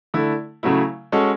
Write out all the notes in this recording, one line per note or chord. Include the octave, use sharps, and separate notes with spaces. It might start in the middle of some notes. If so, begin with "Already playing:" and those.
D3 A3 E4
C#3 F#3 A3 E4
G#3 C#4 F#4 A4